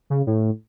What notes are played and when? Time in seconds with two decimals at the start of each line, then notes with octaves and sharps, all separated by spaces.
0.10 C#3
0.27 A2